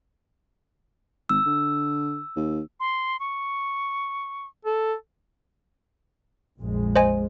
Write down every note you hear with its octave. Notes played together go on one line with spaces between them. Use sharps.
G#1 E6
D3
D#2
C6
C#6
A4
A#1 F2 G#3
C5 D#5 G#5